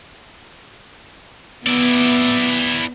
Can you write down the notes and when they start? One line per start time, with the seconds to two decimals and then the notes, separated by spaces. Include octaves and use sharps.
1.66 B3 E4 D5